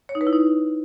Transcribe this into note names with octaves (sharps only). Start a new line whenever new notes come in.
C#5
D#4
B4
E4
D#4